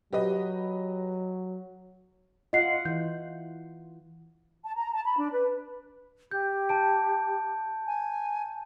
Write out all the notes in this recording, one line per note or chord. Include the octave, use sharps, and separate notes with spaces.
F#3 G4 B4 D#5
F4 D#5 F#5 C7
E3 G6
A5
A#5
A5
B5
D4
B4
G4 G6
A5 D7
G#5